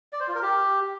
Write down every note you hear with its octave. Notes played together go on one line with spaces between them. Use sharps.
D5
C5
F4
A#4
G4